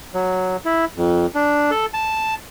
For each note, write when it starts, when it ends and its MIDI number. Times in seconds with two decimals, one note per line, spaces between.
0.14 0.56 54
0.65 0.85 64
0.97 1.26 41
1.35 1.71 62
1.71 1.86 69
1.94 2.34 81